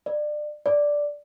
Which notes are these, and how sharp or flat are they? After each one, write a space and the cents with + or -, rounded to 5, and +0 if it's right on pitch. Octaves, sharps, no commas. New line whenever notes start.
D5 +25
D5 -5